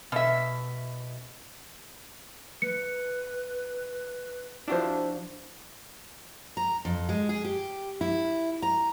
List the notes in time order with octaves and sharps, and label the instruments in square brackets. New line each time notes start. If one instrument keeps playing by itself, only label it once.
[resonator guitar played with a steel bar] B2 E5
[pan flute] B4 [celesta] C#7
[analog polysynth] F3 D4 [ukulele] E4 F#4 C5
[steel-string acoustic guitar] A#5
F2
G#3
G#4
G4
E4
A#5